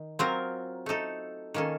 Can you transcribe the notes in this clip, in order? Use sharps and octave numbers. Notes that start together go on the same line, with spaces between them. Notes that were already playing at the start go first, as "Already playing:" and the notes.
Already playing: D#3
F#3 C4 F4 A#4
A3 D#4 A4
D#3 A#3 C#4 A4